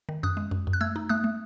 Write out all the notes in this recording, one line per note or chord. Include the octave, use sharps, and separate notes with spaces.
D#3
F#2 D#6 F#6
G#3
F#2
F#2
F#6
A3 E6 G#6
D#4
A3 D#6 F#6
A3